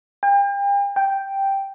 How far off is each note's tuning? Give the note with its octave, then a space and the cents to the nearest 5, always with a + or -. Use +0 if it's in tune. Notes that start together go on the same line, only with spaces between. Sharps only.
G5 +40
G5 +0